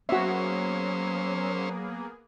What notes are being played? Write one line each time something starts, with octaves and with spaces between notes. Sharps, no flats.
F#3 A#3 B3 C#4 F#4 G#4 C5 E5